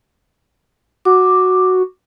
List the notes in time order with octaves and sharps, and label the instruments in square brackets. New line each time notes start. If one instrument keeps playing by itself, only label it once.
[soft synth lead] F#4 [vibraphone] D6